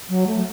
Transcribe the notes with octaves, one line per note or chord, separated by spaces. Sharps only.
F#3
A3